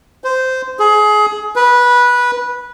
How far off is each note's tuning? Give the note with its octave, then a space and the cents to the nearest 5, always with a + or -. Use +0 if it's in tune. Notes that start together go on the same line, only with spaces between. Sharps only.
C5 -10
G#4 +25
B4 -15